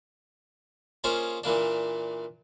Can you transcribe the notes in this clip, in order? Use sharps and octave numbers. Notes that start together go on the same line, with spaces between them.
A#3 C#4 F4 G#4 C5 D#5
A#2 E3 A#3 D4